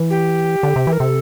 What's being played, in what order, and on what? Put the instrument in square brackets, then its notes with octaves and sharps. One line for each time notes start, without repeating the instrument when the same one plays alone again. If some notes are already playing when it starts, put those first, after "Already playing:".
Already playing: [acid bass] E3
[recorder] G4
[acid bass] D3
C3
E3
[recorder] A#4
[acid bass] C3 [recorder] A4